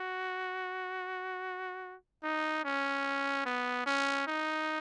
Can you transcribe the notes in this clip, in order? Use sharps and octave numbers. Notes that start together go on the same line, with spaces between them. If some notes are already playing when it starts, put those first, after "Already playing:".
Already playing: F#4
D#4
C#4
B3
C#4
D#4